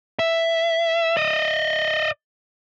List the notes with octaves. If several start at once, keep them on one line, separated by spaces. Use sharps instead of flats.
E5
D5 D#5